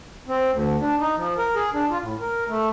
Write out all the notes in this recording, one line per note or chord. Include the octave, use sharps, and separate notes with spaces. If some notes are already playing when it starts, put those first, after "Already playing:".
C4
D2
D4
D#4
F3
A#4
G#4
D4
F4
A2
A#4
A3